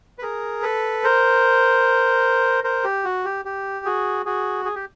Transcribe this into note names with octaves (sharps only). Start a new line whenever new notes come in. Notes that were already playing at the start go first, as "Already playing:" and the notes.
B4
G#4 A#4
A4 B4
A#4 C5
A#4 C5
G4
F#4
G4
G4
F#4 G#4
F#4 G#4
G#4
G4